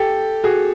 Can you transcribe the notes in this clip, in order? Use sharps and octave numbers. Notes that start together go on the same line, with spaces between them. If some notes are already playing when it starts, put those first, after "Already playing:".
Already playing: G4 A4
F#4 G#4